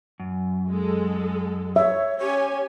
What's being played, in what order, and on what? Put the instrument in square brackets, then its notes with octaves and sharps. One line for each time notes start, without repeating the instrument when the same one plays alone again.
[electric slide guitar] F#2
[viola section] G#3 A4
[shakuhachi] C#5 [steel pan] E5
[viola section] C#4 G4 G#5 [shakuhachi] C#5